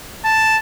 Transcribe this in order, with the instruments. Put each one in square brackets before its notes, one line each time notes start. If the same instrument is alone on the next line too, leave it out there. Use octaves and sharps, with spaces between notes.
[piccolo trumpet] A5